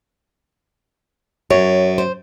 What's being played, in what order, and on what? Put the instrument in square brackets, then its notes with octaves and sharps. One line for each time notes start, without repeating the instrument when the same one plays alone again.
[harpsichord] F#2 [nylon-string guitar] C#5
[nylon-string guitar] C5